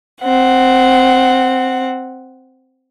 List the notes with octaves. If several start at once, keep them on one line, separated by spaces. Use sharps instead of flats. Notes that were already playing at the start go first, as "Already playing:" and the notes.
C4 F#5